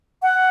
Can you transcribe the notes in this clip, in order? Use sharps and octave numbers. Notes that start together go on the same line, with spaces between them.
F#5